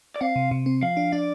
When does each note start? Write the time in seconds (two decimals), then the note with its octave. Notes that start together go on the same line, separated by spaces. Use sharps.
0.16 D5
0.21 C4 F5
0.36 C3
0.51 C3
0.66 C4
0.83 F3 F5
0.97 D4
1.12 D4 D5